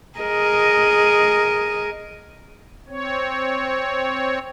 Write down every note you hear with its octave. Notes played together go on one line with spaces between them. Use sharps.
G#4 A#4 D#5
C4 C#5